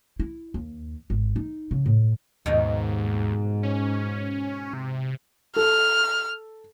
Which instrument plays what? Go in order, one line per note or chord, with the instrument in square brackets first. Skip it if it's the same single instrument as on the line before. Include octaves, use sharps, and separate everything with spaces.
[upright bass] E4
D#2
G#1
D#4
C#3
A2
[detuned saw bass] D#2 [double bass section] G#2 [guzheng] B2 D#3 D#4
[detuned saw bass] C#4
C3
[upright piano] A4 [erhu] F6